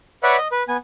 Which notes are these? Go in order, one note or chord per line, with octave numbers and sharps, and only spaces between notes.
B4 C#5 D5 E5 F#5 B5
D#5
B4
B3 G#5